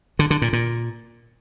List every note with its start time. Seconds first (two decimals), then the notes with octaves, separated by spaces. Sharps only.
0.19 D3
0.30 D3
0.42 A#2
0.53 A#2